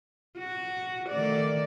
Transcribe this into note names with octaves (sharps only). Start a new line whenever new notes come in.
F#4
D#3 A3 D5